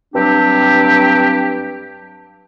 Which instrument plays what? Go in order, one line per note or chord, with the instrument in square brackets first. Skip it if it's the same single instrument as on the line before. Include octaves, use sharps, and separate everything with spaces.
[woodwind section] G2 F#3 C4 D4 G4